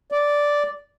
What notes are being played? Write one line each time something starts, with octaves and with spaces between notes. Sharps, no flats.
D5